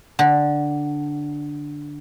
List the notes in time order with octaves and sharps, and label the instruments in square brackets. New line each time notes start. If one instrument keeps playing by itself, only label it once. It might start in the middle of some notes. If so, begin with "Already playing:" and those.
[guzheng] D3 [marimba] F#5